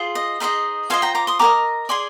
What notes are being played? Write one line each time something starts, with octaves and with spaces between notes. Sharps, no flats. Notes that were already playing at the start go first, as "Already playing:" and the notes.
Already playing: F4 G#4 C5
D#5
D#4 G#4 C5 D#5 F5
F4 C5 D#5 F5 G#5
G5 A#5
A#5 D6
C6 D#6
G4 A#4 D#5 A#5 D6
G#4 D5 G#5 C6